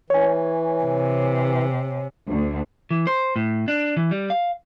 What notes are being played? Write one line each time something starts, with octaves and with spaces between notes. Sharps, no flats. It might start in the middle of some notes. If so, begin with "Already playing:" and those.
E3 C#5 G#5
C3
D2
E3
C5
A2
D4
E3
G3
F5